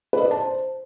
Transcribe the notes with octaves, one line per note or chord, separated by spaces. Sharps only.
B4
D#5
D5
A5
C5